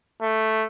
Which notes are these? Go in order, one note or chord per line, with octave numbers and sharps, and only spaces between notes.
A3